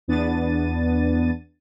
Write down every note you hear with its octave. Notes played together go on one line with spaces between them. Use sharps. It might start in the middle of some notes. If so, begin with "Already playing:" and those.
E2 B3 D4 A6 D#7